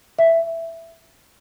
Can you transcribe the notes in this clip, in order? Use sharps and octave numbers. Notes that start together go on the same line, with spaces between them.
E5